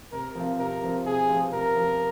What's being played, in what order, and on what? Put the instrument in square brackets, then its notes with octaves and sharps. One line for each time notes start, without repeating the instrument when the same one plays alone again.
[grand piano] C3 [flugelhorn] A#4
[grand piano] F3 C4 F4
[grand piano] C3 [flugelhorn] A#4
[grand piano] F3 C4 F4
[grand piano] C3 [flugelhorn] G#4
[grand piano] F3 C4 F4
[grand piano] C3 [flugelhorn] A#4
[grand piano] F3 C4 F4